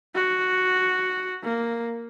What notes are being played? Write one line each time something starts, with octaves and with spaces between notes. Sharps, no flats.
F#4
A#3